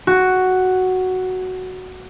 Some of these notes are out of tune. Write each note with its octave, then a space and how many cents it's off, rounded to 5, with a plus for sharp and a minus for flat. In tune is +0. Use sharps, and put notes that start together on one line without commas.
F#4 +5